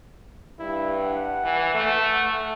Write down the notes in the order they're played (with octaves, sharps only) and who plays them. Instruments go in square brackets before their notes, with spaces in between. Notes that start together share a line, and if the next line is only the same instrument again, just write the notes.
[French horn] G2 [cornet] E4
[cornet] F#5
[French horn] E3
A3